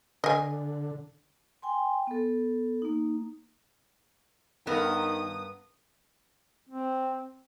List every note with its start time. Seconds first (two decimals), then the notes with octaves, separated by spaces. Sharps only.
0.24 D3 D#5 G#5
1.62 G5 G#5 C6
2.07 B3 A4
2.82 A#3 D#4
4.67 G2 D#3 B3 A#4 D#6
6.69 C4